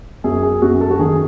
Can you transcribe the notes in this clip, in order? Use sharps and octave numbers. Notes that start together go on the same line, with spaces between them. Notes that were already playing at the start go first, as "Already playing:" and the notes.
F#2 G#4
G#4
F#2 F#4
A4
F#4
D#3 G#4